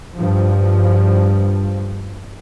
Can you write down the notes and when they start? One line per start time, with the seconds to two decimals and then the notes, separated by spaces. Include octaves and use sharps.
0.15 G2 F3